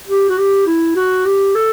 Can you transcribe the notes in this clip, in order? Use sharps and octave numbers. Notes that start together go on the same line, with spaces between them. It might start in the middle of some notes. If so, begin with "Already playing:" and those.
G4
F#4
G4
E4
F#4
G4
A4